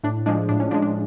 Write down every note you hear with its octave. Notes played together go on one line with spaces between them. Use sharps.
A2 D4
F3 G#3 D4
A2 D4
C#4
F3 G#3 D4
D4